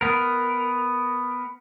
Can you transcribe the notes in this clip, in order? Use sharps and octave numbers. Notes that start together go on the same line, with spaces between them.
B3 A#4